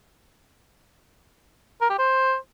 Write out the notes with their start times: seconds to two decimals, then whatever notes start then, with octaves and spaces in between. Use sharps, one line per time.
1.81 A#4
1.90 G4
1.99 C5